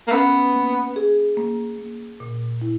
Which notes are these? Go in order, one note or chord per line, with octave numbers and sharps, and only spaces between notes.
A#3
B3 C#4
A#3
G#4
A#3
A#3
A#2
E4